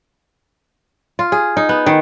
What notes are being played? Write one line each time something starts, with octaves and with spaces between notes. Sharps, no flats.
F4
G#4
D#4
B3
D#3